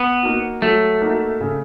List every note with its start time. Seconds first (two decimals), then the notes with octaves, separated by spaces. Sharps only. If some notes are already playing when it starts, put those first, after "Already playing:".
Already playing: B3
0.23 A#3 D#4 F#4
0.62 F#3 A3
1.01 A#3 D#4 F#4
1.41 C#3